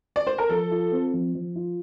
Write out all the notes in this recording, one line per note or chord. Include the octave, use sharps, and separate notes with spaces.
D5
C5
A#4
F3 A4
F4
C4
F3
F3
F4